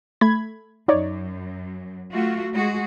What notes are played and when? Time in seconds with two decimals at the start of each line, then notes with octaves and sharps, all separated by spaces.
0.21 A3 B5 G#6
0.88 F#2 F#3 D#4 C#5 D5
2.11 A3 F4 F#4
2.52 G#3 F#4 G#4